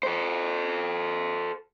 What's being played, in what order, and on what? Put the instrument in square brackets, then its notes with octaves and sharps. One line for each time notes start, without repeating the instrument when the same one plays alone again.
[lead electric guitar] A4 C5